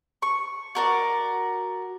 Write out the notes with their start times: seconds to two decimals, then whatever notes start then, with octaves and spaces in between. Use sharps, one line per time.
0.22 C#6
0.75 F#4 A#4 D5